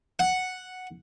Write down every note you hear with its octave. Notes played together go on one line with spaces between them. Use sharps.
F#5